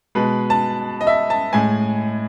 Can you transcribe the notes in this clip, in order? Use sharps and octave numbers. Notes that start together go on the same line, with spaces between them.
B2 G#3 B4
A5
D#5
E5
A5
A2 G#3 G#5